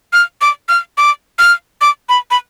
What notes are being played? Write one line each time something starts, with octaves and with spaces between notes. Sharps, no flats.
F6
D6
F6
D6
F6
D6
B5
B5